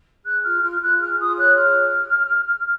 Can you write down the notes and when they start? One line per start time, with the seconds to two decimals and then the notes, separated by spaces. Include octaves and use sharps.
0.25 G#4 F#6
0.44 F4 F6
0.62 F4 F6
0.81 F4 F#6
1.00 G#4 F6
1.18 F4 D#6
1.37 C#5 F#6
1.56 G#4 F6